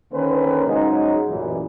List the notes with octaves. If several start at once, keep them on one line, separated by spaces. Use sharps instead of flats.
D3 D#3 A#3 C#4 B4 C5
G#2 C#3 F#3 G#3 D#4
A1 F#2 A#2 E3